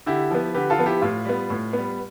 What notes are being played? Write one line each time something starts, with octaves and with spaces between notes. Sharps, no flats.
D3 E4 G4
F3 B3
D3 G4 B4
F4 A4
F3 B3
E4 G4
A2 F4
G3 B3
A2
G3 B3